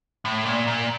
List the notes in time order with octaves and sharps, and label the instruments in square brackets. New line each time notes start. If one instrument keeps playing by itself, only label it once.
[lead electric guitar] A2
A#2
A#2